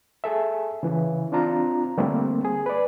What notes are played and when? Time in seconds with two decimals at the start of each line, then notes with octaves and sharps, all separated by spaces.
0.24 G#4 A4 E5
0.83 C#3 E3
1.32 C4 D4 F4 A#5
1.97 D3 G3 A3 A#3 C4
2.45 G#4
2.66 B4 D5